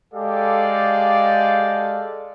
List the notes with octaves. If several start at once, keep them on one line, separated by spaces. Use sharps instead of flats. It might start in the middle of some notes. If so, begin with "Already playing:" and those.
G#3 G4 A4 D5 F5